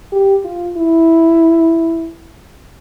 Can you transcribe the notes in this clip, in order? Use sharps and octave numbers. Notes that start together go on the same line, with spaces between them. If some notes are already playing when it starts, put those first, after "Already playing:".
G4
F4
E4